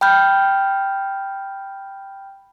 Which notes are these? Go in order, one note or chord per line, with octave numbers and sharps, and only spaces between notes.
G5 B5 F6 G6